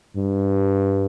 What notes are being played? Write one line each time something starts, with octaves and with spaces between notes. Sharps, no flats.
G2